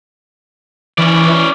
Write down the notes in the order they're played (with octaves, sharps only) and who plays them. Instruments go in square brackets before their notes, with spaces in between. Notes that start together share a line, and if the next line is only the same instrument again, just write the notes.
[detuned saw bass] E3 [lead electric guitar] C#4 D5